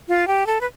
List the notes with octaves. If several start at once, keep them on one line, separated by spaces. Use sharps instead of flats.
F4
G4
A4
B4